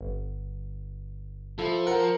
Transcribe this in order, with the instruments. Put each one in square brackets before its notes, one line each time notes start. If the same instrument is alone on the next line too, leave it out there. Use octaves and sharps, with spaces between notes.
[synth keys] G1
[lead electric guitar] F3 [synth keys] E4 [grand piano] A4
[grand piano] A#4 [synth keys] F#5 C#7